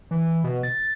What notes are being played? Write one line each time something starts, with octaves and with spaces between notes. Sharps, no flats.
E3
B2
A6